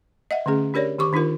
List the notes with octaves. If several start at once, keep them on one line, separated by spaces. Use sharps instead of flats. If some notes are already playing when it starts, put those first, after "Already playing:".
D#5 E5 F#5
D3 A3 C#4 G#4
D4 G4 A#4 C#5 D5
D#3 G4 C#6 D6
D#3 D4 D#4 F4 A#4